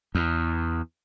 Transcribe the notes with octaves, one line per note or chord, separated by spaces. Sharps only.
E2